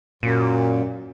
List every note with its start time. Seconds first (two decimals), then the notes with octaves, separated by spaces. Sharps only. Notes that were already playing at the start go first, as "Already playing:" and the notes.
0.23 F#2 A#2